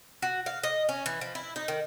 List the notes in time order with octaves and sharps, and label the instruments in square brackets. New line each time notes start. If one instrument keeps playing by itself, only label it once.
[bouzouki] F#4
F5
D#5
C#4
E3
F3
E4
D#4
D#3